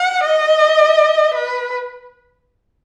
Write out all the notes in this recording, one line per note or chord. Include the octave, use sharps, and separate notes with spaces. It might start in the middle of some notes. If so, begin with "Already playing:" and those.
Already playing: F#5
D#5
B4